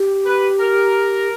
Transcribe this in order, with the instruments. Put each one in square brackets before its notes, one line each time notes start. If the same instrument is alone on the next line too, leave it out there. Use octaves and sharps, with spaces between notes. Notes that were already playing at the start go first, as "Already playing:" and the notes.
Already playing: [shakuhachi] G4
[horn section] B4
A#4